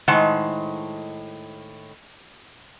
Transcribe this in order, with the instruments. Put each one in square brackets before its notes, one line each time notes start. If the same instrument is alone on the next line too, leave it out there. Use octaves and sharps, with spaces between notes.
[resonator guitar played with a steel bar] A2 D#3 G#3 C5 F#5 A5